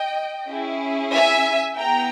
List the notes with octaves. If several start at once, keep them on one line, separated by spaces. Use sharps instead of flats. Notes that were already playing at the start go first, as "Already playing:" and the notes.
Already playing: D#5 G5
C#4 E4 G#4
E5 G#5
B3 E4 G#4 G5 A#5